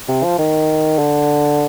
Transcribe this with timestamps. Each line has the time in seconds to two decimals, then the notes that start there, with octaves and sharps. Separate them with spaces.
0.09 C3
0.24 F3
0.39 D#3
0.99 D3